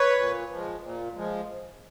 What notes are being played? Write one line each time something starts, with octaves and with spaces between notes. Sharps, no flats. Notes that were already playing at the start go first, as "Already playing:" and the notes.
Already playing: B4 C#5
A#2
F3
G#3
A#2
F3 G#3